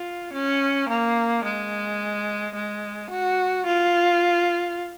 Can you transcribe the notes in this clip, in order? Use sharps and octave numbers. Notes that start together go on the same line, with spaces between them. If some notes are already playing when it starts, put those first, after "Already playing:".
Already playing: F4
C#4
A#3
G#3
G#3
F#4
F4